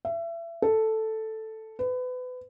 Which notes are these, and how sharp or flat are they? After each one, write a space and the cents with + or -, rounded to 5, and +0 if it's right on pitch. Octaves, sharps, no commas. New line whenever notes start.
E5 +30
A4 +0
B4 +30